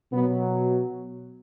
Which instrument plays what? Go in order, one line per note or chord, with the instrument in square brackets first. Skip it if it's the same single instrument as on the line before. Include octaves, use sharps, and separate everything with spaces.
[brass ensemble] B2 F#3 B3